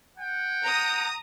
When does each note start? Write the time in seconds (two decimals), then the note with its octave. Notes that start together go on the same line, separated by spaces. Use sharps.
0.18 F#5 G5
0.64 A#5 D#6